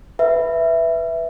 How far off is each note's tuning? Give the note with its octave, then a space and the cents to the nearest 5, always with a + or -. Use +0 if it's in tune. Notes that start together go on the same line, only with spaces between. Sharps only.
B4 +0 E5 +0